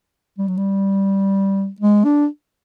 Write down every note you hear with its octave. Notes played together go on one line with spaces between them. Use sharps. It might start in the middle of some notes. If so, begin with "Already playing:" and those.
G3
F#3
G3
G#3
D4